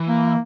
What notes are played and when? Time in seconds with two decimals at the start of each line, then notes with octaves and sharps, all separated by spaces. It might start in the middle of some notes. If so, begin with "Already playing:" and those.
Already playing: E3
0.08 A#3